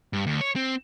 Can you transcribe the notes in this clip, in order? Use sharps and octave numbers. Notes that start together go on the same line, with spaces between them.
G2
D2
C#5
C4